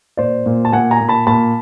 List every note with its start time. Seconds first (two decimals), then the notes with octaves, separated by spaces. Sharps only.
0.17 A#2 C5 D5
0.46 A#2
0.65 A5
0.72 A#2 F#5 G#5
0.91 G#5 A#5
1.01 A#2
1.09 A5 B5
1.27 A#2 A5 B5